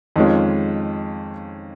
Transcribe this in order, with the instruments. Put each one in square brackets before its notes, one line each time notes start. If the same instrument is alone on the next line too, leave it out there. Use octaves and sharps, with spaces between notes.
[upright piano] F2 D#3 G#3 C#4 F4